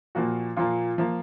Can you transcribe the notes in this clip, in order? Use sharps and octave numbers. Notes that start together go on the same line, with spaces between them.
A#2 F3 A#3 F#4
A#2 F3 A#3 F4
F3 A#3